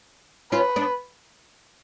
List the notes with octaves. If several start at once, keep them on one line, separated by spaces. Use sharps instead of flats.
C#4 F4 B4
B3 D4